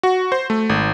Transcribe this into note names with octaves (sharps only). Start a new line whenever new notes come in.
F#4
C5
A3
G#1